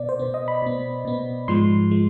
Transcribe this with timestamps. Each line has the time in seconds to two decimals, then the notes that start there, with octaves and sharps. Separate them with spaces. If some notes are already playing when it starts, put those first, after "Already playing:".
Already playing: B2 B3 D5
0.09 C5
0.19 B2 B3
0.34 D#5
0.48 B5
0.62 B2 B3
1.05 B2 B3
1.48 G#2 F3 G#3 C6
1.91 F3 G#3